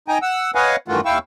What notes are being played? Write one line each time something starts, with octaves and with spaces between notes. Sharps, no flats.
D#4 G5 G#5 A#5
F#5 E6
B4 C#5 D#5 F5 F#5 G#5
G2 D#3 E3 A3 F4 F#4
D#2 E4 F5 G5 C#6 E6